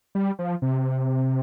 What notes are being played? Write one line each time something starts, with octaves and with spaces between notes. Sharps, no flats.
G3
F3
C3